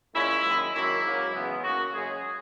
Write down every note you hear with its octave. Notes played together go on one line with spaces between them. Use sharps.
A#2 G#3 C#4 E4
F#2 D#3 G#3
F#2 D#3 F#3 A#3 E4
G#2 F#3 A#3 C#4
C#3 E3 G#3 B3
D#3 A#3 C#4 F#4
F#2 C#3 G#3 C#4 G#4